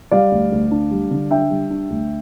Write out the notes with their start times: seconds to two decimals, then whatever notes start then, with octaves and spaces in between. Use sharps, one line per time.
0.11 G3 D5 F5
0.31 D2
0.52 D2
0.71 D4
0.91 G3
1.11 D3
1.31 D4 E5 G5
1.50 G3
1.70 D4
1.90 D2